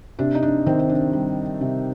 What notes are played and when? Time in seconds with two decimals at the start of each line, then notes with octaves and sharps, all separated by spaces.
0.19 C3 D4
0.35 D#4
0.43 D4
0.66 D#3 C4
0.79 C4
0.89 D4
1.13 G3
1.61 C3